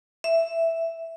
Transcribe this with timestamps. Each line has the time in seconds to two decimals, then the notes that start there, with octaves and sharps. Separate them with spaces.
0.24 E5